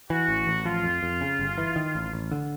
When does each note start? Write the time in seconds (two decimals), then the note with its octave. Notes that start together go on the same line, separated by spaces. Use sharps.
0.10 E3 F#4
0.29 A1
0.47 A1
0.65 F3 F4
0.83 F2
1.03 F2
1.21 C#3
1.39 G1
1.58 E3
1.76 D#3
1.95 A1
2.13 A1
2.32 D3